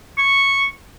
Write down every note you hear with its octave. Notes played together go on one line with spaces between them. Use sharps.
C#6